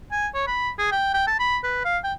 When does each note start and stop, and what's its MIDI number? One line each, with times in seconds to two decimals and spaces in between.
0.11 0.27 80
0.34 0.44 73
0.47 0.70 83
0.78 0.91 68
0.92 1.11 79
1.14 1.24 79
1.27 1.38 81
1.39 1.58 83
1.63 1.83 71
1.85 1.98 77
2.04 2.13 79